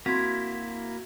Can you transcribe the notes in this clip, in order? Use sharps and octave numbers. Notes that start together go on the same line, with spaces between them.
A#3 C4 E4 F#4 C6 G#6 B6